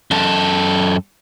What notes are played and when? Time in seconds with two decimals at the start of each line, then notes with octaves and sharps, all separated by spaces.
0.11 F#2 A4